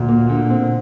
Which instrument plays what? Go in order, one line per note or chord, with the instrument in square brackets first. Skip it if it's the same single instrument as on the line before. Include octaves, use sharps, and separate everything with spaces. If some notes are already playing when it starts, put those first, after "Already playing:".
Already playing: [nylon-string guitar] D2 [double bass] A#2
[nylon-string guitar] A#3
D3
C4